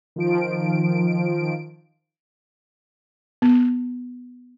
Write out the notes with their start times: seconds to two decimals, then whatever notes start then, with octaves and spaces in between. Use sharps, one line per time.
0.16 D#3 F3 D7
3.42 B3